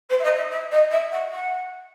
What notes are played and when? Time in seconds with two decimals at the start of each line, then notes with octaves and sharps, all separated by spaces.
0.09 C5
0.19 E5
0.23 D#5
0.36 E5
0.50 E5
0.71 D#5
0.90 E5
1.11 F#5
1.31 F#5